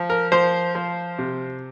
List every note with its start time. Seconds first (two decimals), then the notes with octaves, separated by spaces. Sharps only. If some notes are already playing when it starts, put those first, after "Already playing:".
Already playing: F3
0.10 A#4
0.32 F3 C5
0.75 F3
1.19 C3